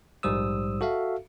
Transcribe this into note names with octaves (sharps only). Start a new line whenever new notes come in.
A#1 G#2 G3 C5 D#6 E6
F#4 A4 E5 F5